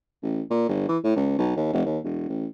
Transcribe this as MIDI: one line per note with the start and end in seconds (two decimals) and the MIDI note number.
0.23 0.41 33
0.50 0.68 46
0.69 0.87 31
0.88 0.98 52
1.03 1.14 45
1.16 1.35 37
1.38 1.51 35
1.56 1.72 39
1.73 1.81 29
1.85 1.98 39
2.04 2.26 28
2.28 2.46 33